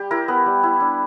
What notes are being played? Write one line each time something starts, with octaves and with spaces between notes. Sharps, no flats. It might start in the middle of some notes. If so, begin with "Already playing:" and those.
Already playing: G3 G4
E4 A#4
B3 B4
G3
E4
D4